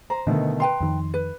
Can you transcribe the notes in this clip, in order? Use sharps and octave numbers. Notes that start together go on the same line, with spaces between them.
C5 A#5
B2 D3 D#3 A3
B4 G5 A#5 C6
F2 D#3
B4